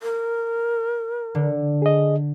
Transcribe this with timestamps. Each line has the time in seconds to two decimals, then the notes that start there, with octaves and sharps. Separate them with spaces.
0.03 A#4
1.35 D3
1.82 G#4 D#5